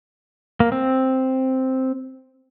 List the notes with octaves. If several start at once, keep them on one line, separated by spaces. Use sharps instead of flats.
A#3
C4